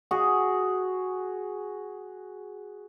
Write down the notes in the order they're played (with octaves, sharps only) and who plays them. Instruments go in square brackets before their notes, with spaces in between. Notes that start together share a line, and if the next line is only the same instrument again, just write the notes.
[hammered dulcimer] F#4 G#4